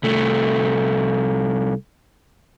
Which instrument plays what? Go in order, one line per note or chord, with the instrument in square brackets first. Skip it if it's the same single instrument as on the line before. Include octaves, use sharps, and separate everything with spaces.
[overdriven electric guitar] C2 A3